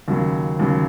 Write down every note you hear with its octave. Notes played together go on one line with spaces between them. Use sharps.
D#2 C#3 F#3
D#2 C#3 F#3